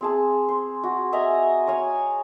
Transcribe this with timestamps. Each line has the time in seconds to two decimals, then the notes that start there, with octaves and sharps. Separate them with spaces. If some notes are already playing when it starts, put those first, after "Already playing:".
0.01 C4 G#4 A5
0.49 C5
0.83 F#4
1.13 D#5 E5 G#5 A#5
1.67 C#5 F5 G#5